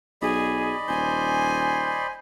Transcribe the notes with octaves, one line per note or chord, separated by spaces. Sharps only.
B1 G#4 D5 D#5 B5
D#1 C5 G#5